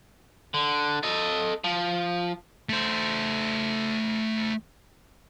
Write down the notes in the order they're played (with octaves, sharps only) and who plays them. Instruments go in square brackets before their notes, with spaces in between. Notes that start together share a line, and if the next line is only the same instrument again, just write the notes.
[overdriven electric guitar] D3
A4 D#5
F3
[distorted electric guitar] A3 C5